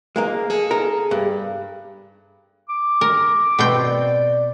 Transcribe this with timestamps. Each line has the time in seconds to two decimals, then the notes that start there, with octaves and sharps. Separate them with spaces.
0.16 G#3 A#3 A#4
0.50 G#4 A4
0.71 A#4
1.11 G2
2.69 D6
3.01 A#4
3.59 B2 C4 G5
3.82 D5